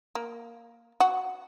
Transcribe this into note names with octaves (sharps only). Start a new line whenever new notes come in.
A#3
F#4